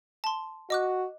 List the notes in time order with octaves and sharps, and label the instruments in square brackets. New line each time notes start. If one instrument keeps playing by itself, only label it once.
[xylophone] A5 C6
[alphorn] F#4 [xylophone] D#5 D6 F#6